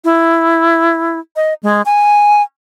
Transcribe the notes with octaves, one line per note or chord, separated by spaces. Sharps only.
E4
D#5
G#3
G#5